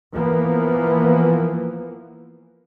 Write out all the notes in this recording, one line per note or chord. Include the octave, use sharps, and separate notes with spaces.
E3 F3 A#3 B3